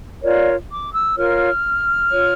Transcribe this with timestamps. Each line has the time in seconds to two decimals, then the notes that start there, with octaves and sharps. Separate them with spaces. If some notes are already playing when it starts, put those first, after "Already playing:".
0.23 F4 A#4 C#5 D5
0.71 D6
0.94 E6
1.17 F4 A#4 C#5 F6
2.11 F4 C#5